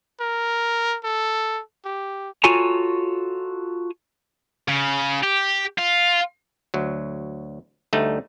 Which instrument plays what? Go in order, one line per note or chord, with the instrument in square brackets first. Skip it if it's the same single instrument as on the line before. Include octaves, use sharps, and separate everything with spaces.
[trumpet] A#4
A4
G4
[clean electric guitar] F4 F#4 A4 C#5 G#5 A#5
[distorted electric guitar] C#3
G4
F4
[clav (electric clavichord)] D2 F#3
D2 G3 A3 D#4